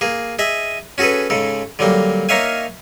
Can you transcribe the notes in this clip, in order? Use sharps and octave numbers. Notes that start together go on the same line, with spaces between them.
A#3 G#4
G#4 D#5 E5
C#4 F#4 G#4 A4 B4
G#2 C#3 A4
D3 F#3 G3 A#3
A#3 D#4 C#5 E5 F5 G#5